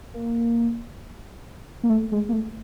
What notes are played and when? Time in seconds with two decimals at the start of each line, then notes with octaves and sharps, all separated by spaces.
0.14 A#3
1.83 A#3
1.89 A3
2.12 G#3
2.29 A#3
2.33 A3